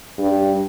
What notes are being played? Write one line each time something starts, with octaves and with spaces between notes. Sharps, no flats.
G2